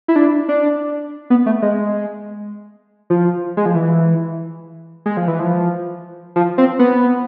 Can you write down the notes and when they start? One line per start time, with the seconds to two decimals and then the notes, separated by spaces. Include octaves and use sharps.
0.08 E4
0.16 D4
0.49 D4
1.30 B3
1.46 A3
1.62 G#3
3.10 F3
3.57 G#3
3.66 F3
3.75 E3
5.06 G#3
5.17 F3
5.28 E3
5.40 F3
6.36 F3
6.58 C4
6.79 B3